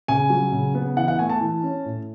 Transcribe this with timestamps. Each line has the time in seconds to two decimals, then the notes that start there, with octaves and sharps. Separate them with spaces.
0.08 C#3 G#5
0.30 F#3
0.52 C#3
0.75 B3
0.97 E3 F#5
1.08 F#5
1.19 A3 G#5
1.30 A5
1.41 E3
1.63 C#4
1.85 A2